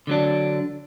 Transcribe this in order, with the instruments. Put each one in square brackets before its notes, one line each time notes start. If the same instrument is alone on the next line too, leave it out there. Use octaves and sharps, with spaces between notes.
[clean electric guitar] D3 F#3 D4